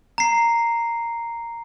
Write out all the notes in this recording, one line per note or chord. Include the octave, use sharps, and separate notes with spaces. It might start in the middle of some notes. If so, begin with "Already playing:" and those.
A#5 C7